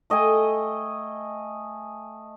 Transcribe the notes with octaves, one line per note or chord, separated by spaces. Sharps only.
A3 D#5 G5 G#5